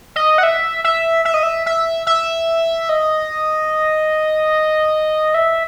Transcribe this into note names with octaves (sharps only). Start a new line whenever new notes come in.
D#5
F#5
E5
E5
E5
D#5
E5
E5
E5
D#5
E5